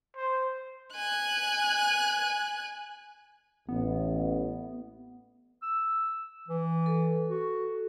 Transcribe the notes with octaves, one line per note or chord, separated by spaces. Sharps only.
C5
G#5 F#6
A1 B3
E6
E3
A4
F#4